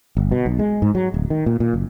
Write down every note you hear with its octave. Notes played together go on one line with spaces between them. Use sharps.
G1
B2
B1
G#3
G#2
F#3
D1
D#3
A#2
A#2
F#1